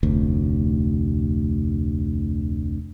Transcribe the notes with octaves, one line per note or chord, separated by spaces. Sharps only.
F1 D2